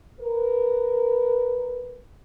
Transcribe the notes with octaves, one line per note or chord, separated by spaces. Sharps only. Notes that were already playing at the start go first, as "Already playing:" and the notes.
A#4 B4